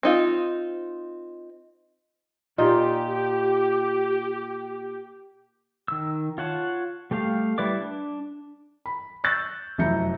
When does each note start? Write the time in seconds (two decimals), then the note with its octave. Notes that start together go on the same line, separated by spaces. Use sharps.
0.03 C4 D#4 F4
2.58 A#2 D#4 F4 G4
5.88 D#3 E6
6.38 F4 C#5 F#5 A5
7.11 G3 A3 G4 F5
7.58 G3 E4 B4 D5 D6
7.81 D4
8.86 B5
9.24 C#6 E6 F#6 G6 A6
9.78 F1 F#2 E4 A#5 G6 C#7